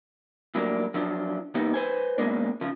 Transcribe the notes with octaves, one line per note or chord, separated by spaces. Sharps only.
A2 F#3 G3 A#3 D4
F3 F#3 D4 F4
C2 E3 A#3 B3 D#4 G4
B4 C5 G#5
F#2 B2 E3 G#3 A#3 D4
C#3 F3